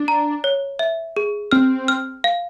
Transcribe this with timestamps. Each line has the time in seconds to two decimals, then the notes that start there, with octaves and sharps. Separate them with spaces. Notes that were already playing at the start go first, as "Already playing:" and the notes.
Already playing: D4
0.08 A#5
0.44 C#5
0.79 E5
1.17 G#4
1.51 C4 F6
1.88 F6
2.24 F5